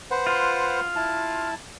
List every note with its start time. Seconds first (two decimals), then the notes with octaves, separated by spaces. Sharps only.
0.11 B4 C5 F#5
0.27 F4
0.96 E4 A5